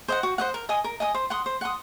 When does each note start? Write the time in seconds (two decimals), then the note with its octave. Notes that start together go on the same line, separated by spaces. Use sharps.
0.08 C5 D#5 F#5
0.23 F#4
0.38 C5 D#5 F#5
0.54 A#4
0.69 D#5 G#5 D#6
0.84 A#4
1.00 D#5 G#5 D#6
1.14 C5
1.30 F#5 C6 D#6
1.46 C5
1.61 F#5 C6 D#6